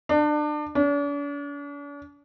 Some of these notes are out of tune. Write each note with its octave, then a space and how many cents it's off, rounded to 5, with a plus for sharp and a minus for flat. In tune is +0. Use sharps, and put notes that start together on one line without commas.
D4 +30
D4 -45